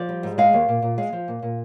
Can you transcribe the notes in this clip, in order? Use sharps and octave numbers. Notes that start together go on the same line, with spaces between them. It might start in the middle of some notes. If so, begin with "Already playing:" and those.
Already playing: F3 D5
G3
G#2
G#3 F5
D#2
A#2
A#2
G#3 F5
F3
A#2
A#2